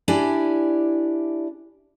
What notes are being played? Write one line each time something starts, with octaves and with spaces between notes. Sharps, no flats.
D4 E4 G4 D5 G#5